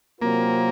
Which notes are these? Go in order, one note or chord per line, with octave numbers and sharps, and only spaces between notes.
C3 F#3 A#3 C4 F4 A#4